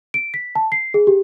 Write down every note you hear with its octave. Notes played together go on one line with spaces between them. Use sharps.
D7
B6
A5
C7
G#4
G4